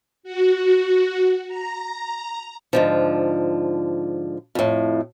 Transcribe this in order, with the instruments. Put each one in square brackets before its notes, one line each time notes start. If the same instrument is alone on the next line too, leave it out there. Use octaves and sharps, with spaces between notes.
[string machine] F#4
A#5
[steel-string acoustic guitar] G#2 D3 F3
F2 A2